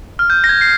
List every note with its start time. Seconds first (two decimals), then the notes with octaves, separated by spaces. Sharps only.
0.19 F6
0.30 G6
0.44 A#6
0.49 G#6
0.61 C7